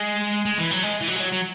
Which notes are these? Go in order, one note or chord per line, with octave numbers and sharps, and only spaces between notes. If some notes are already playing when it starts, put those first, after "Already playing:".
Already playing: G#3
G#3
E3
F#3
G#3
E3
F#3
G#3
F#3
F#3